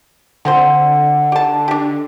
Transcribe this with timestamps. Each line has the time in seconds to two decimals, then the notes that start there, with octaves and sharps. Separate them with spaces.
0.45 D3 F3 C4 C5 F#5
1.32 G4 A5
1.68 D4 G4